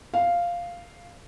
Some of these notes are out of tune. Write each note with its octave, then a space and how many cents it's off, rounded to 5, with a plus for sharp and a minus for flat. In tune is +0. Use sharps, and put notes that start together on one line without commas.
F5 -5